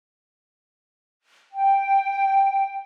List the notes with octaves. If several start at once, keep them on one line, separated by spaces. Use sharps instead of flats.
G5